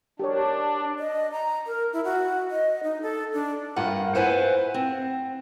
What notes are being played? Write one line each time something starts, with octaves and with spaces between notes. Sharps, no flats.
D4 G4 A#4 C#5
D#5
A#5
A#4
E4
F#4
D#5
D#4
A4
D4
G2 A#3 F4 F#5
E4 B4 C5 F5 F#5 G#5
C4